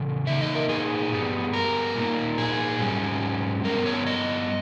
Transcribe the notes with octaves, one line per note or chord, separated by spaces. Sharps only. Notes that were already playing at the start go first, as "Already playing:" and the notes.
Already playing: C#3 E3
A#2 A#3 D#4 E5
D#5
A#4
G#4
G2 G3 B3
A#4
A#2 A#3 D#4
G#4
G#2 G3 C#4
G2 G3 B3 A#4
C#5
D#5